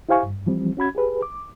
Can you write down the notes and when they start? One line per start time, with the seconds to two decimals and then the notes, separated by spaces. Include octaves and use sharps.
0.09 E4 G4 C5 F5 G#5 C#6
0.23 G2
0.46 E3 F3 G3 C4
0.77 C#4 F#4 B5 G#6
0.95 G4 G#4 B4
1.22 D6